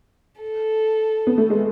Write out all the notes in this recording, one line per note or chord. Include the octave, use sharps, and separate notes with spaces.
A4
B3
A3
G#3